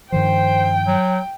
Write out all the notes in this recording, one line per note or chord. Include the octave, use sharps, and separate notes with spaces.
G2 D#3 F3 C5 G5
F#3